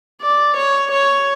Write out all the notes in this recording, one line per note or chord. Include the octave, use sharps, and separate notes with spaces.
D5
C#5
C#5